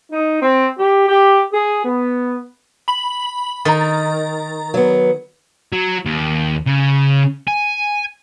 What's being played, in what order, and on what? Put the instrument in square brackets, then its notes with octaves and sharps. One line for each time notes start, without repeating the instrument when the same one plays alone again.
[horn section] D#4
C4
G4
G4
G#4
B3
[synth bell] B5 F#7
[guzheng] D#3 [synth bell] A#5 A6
[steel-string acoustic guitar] F#3 B3
[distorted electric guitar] F#3
D#2
C#3
G#5